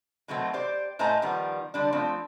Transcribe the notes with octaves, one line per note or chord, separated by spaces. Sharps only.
B2 D#3 F#3 A3 C4
G4 C5 D5
A2 A3 C5 D#5 G#5 A#5
D#3 F3 G3 B3
D3 G3 D4
F3 A3 C4